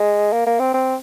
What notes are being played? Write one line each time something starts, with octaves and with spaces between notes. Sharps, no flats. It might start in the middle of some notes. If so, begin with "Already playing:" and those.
Already playing: G#3
A#3
A#3
C4
C4